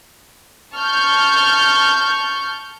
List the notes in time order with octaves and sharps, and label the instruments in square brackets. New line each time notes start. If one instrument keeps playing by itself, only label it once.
[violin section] A5 C#6 F6 G6